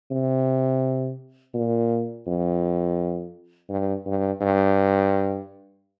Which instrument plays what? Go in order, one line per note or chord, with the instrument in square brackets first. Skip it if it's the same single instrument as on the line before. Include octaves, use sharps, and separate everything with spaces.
[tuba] C3
A#2
F2
G2
G2
G2